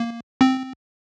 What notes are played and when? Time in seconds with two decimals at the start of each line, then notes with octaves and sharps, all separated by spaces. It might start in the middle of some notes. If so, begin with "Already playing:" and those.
Already playing: A#3
0.41 C4